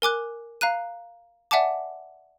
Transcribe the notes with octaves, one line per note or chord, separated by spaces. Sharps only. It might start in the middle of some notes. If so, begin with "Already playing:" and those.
A#4 G#5 D6 F#6
F5 A#5 F#6 D#7
D5 E5 F#5 G#5 A5 D6